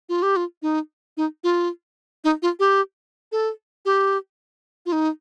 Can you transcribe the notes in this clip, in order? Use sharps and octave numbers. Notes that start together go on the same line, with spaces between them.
F4
G4
F4
D#4
D#4
F4
D#4
F4
G4
A4
G4
F4
D#4